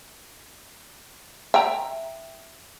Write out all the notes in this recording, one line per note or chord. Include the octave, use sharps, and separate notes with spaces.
E5 G5 A#5